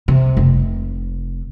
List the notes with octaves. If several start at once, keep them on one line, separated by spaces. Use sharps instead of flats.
C3
F1